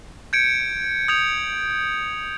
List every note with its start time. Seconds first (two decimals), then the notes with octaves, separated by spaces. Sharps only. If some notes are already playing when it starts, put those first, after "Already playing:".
0.33 G6 G#6 C#7 D7
1.08 D#6 G6 G#6 F7